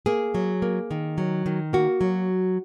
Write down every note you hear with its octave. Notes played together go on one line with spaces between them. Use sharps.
A#3 G#4
F#3
A#3
D#3
F#3
D#3
A#3 F#4
F#3